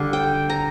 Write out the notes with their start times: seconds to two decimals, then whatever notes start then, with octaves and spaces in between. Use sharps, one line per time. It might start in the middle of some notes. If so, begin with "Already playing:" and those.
Already playing: D3 G3 D4 D5 F5
0.13 G5
0.50 A#5